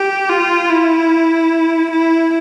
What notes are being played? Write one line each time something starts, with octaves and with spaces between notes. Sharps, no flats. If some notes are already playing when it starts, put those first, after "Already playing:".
Already playing: G4
F4
E4
E4